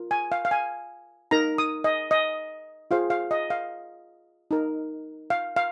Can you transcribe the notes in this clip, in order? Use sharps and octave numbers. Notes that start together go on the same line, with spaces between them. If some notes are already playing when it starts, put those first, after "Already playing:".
Already playing: F4 A#4
G#5
F5
F5
G#5
D#4 A#4 A#5
D#6
D#5
D#5
F4 G#4 C5 F5
F5
D#5
F5
D#4 A#4
F5
F5